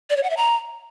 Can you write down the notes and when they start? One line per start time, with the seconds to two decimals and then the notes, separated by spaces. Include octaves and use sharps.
0.10 D5
0.17 C#5
0.23 F#5
0.30 E5
0.37 A#5